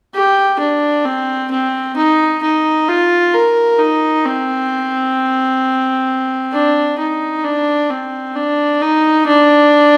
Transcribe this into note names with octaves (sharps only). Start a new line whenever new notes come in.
G4
D4
C4
C4
D#4
D#4
F4
A#4
D#4
C4
D4
D#4
D4
C4
D4
D#4
D4